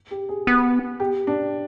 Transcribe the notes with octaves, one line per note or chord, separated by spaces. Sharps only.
G4
G#4
B3
G4
D4